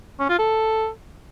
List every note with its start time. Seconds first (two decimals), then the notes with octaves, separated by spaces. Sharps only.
0.20 C#4
0.29 F4
0.39 A4